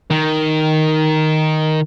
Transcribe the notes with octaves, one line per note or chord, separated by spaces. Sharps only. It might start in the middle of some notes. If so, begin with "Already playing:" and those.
D#3